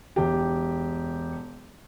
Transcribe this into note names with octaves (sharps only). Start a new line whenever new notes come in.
E1 G4